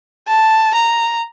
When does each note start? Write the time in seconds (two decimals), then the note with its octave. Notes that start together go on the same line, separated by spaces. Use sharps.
0.28 A5
0.75 A#5